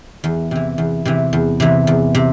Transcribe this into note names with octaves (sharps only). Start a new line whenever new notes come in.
E2
C3 E3
E2
C3 E3
E2
C3 E3
E2
C3